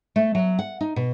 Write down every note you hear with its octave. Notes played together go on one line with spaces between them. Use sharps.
A3
F#3
F#5
D#4
B2